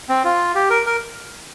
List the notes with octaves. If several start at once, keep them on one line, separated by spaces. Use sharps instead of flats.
C4
F4
G4
A#4
A#4